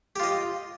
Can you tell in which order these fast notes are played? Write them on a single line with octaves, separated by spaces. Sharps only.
G4 F4 D#5